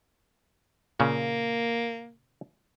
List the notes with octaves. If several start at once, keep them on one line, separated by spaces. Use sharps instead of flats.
A#2 C#3 A#3 C#4